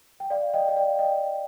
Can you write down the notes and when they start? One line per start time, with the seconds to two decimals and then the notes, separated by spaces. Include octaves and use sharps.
0.20 G5
0.30 D5 F5
0.54 D#5 G5
0.69 G5
0.76 D5 F5
0.99 D#5 G5